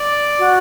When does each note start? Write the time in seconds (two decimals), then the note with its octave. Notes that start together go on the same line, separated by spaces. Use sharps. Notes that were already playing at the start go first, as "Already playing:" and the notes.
Already playing: D5
0.39 F#4